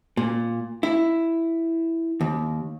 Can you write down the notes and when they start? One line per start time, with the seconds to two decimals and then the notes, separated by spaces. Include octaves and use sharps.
0.17 A#2
0.83 E4
2.21 D#2